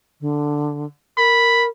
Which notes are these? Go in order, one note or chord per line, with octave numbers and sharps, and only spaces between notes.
D3
A#4 B5